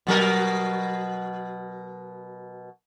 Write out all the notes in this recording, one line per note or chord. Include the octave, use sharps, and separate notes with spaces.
B2 F#3 A#4